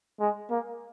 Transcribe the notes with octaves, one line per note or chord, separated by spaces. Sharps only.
G#3
A#3